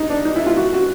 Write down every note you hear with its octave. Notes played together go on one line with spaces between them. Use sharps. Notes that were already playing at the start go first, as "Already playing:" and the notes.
Already playing: D#4
D4
D#4
E4
F4
F#4
F#4